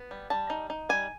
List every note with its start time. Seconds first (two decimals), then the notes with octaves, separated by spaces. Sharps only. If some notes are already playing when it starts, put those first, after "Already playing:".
Already playing: B3
0.11 G3
0.30 G3 A5
0.50 D#4
0.70 D#4
0.89 G3 G#5